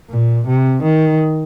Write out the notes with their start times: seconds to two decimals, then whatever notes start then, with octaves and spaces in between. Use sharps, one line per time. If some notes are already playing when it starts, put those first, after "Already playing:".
0.10 A#2
0.47 C3
0.83 D#3